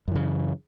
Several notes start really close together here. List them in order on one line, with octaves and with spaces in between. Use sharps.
F#2 E3 C#3